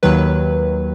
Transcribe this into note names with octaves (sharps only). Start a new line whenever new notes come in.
D#2 D#3 F#3 B4